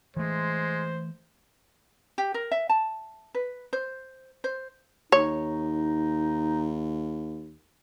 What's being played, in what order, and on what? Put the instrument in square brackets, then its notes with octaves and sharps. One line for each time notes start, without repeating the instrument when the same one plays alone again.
[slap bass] E3 A3 [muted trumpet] G#3 [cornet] C5
[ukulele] G4
A#4
E5
A5
B4
C5
C5
[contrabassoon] D#2 [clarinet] D#4 [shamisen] C#5